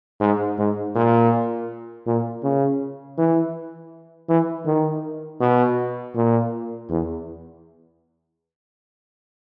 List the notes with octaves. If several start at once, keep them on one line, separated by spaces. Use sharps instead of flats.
G#2
G#2
A#2
A#2
C#3
E3
E3
D#3
B2
A#2
E2